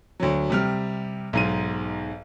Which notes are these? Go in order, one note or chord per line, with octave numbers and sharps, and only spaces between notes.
D2 F#3
C3 G3 F6
B1 G#2 D#7